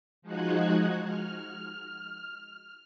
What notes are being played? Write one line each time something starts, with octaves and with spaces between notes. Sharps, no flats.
F3 G#3 D#4 F#4 F#6 G#6
F6